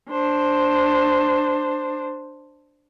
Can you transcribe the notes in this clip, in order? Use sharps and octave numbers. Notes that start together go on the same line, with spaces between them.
D4 C5